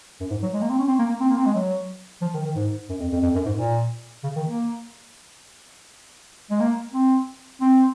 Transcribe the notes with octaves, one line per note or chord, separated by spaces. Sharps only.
F#2
G#2
F#3
G#3
A#3
C4
C#4
C4
A#3
A#3
C4
A#3
C4
G#3
F#3
F3
D#3
D#3
G#2
F#2
F2
F2
F2
F#2
G#2
A#2
C#3
D#3
A#3
G#3
A#3
C4
C4